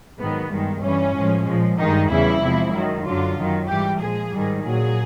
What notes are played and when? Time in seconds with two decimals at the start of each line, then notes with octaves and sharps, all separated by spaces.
0.19 G#2 D#3 F#3 B3
0.50 G2 D#3 G#3
0.82 G2 E3 G3 C#4
1.15 A2 F3 G#3
1.46 A#2 F3 G#3
1.78 G2 D#3 G#3 D#4
2.10 E2 C#3 E3 G3 E4
2.42 E2 C3 F3 G#3
2.73 F#2 D#3 F#3
3.04 F#2 D3 F#3 F4
3.37 F#2 D#3 F#3
3.68 G#2 E3 G3 G4
4.00 A#2 F3 G#3 G#4
4.32 G#2 D#3 G3
4.64 A#2 F#3 G#4